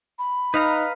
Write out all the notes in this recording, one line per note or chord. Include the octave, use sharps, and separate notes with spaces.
B5
D#4 B4 F5 A#5